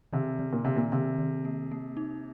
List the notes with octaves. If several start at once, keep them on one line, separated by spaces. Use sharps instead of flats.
C3 D#3
D#3
A#2
C3 D#3
A#2
C3 D#3
D#3
A#3
A#3
D#4